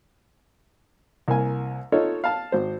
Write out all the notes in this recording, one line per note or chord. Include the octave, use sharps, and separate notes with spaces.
C2 A#3 G#5
D#4 F4 A4 C#5
F5 A5
G#1 C5